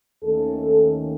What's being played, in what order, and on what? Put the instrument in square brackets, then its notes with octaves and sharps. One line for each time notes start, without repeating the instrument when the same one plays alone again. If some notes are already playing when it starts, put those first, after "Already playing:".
[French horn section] D#2 D#3 A3 C#4 A4